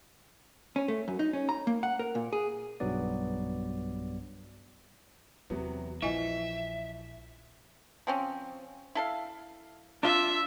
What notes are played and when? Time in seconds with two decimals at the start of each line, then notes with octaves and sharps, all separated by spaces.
0.76 C#4
0.88 A3
1.08 F#2
1.19 D#4
1.33 C#4
1.49 A#5
1.67 A#3
1.83 F#5
1.99 A#4
2.15 A#2
2.33 G#4
2.80 B1 G2 F#3 B3 D5
5.50 E2 C3 F#3 B3
6.02 A#1 E3 F3 E4 D#5 E5 G#5
8.07 F3 C4 C#4
8.95 E4 A4 F5
10.03 D4 F4 E5